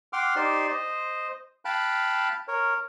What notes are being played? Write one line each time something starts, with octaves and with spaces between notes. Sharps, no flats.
F#5 G5 C6 D6 F6
D#4 G4 C5 D5 C6
C5 D#5
F5 G5 A5 B5 F#6
A#4 C#5